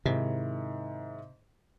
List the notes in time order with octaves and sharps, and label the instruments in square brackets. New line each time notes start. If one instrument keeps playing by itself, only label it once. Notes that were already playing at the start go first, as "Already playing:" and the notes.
[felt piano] G#2 D#3 E4 [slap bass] C3